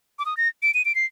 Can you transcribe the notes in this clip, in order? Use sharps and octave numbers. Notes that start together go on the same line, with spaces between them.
D6
D#6
A#6
D7
D#7
D7
C7